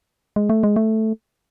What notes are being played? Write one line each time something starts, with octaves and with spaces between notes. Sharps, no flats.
G#3
A3
G#3
A3